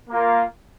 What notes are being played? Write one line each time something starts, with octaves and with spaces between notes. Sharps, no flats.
A#3 F4